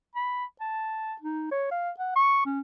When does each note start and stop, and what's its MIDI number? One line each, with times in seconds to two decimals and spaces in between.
0.15 0.45 83
0.61 1.14 81
1.21 1.47 63
1.52 1.69 73
1.71 1.90 77
1.99 2.14 78
2.16 2.44 85
2.46 2.60 61